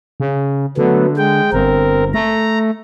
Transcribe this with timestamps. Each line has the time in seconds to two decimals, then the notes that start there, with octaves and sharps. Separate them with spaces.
0.20 C#3
0.77 D3 F#3 A3 B3
1.18 G#3 G5
1.53 G1 C4 A#4
2.14 A3 A#5